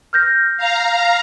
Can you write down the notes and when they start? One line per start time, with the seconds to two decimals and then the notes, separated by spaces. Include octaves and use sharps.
0.13 F6 G6 A#6
0.57 F5 A#5